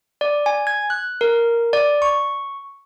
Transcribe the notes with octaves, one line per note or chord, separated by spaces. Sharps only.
D5
G#5
G#6
F#6
A#4
D5
C#6